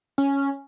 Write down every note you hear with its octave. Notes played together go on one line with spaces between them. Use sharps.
C#4